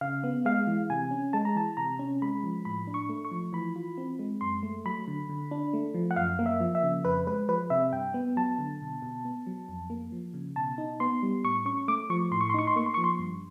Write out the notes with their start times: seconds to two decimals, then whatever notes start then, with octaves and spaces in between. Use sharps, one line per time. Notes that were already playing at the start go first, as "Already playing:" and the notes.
0.01 C#3 F5
0.24 B3
0.45 G#3 F5
0.67 E3
0.90 C3 G#5
1.11 C#4
1.33 G#3 A5
1.45 A#5
1.55 E3 A5
1.77 C3 A#5
1.99 C#4
2.22 G#3 B5
2.43 F3
2.65 A2 B5
2.87 D4
2.94 C#6
3.09 A3
3.25 C#6
3.31 F3
3.53 E3 B5
3.76 F4
3.97 C4
4.19 G#3
4.41 F#2 C6
4.63 A3
4.86 F#3 B5
5.08 D3
5.29 D3
5.51 D4
5.73 A3
5.94 F3
6.11 F#5
6.16 F#2 F5
6.39 A#3
6.46 E5
6.60 F3
6.75 E5
6.83 C#3
7.05 F2 B4
7.27 G#3 B4
7.49 F3 B4
7.70 C3 E5
7.92 G2 G5
8.14 B3
8.37 F#3 A5
8.58 D3
8.81 B2
9.02 B2
9.25 B3
9.46 F#3
9.69 F2
9.90 A#3
10.12 F3
10.34 C#3
10.56 B2 A5
10.78 D#4
11.00 B3 C6
11.22 G3
11.44 A2 C#6
11.66 C#4 C#6
11.88 A3 D6
12.10 F3 C#6
12.31 A2 C6
12.41 C#6
12.50 C6
12.54 D#4 C#6
12.67 C6
12.76 A#3 C#6
12.86 C6
12.94 F3 C#6
13.04 C6
13.19 G2